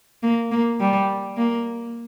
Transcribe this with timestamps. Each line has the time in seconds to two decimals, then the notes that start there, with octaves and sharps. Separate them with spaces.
0.23 A#3
0.51 A#3
0.80 G3
1.37 A#3